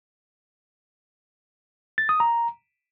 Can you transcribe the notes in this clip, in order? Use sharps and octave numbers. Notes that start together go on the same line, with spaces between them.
A6
D#6
A#5